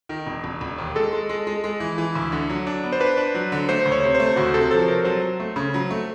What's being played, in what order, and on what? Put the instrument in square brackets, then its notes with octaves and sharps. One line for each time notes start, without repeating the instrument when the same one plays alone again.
[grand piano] D#3
E1
E1
E1
D#2
[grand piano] G#3 [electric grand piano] A4
[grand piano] G#3
G#3
G#3
G#3
E3
E3
D2
D3
F#3
D4
B3
[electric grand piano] C5
[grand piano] D4 [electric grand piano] B4
[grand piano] D4
F#3
D3
[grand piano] A3 [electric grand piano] C5
[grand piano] D2
[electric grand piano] C#5
[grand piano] C3
[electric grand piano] C5
[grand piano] A3
[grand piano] D2 [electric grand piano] F#4
[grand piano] C3 [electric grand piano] A4
[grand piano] F3 [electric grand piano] A4
[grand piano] C3 [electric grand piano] A#4
[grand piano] F#3 [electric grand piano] C5
[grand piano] F#3
A3
C#3
F#3
A3